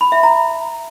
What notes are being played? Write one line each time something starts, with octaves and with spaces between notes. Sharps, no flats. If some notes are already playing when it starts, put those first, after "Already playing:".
B5
E5
A#5